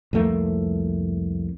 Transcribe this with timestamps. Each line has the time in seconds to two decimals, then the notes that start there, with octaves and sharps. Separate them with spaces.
0.13 C2 F2 A3 A#3